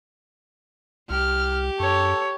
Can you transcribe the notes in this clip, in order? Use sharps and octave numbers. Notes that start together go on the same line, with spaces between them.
C2 G4 F6
F#2 A4 C#5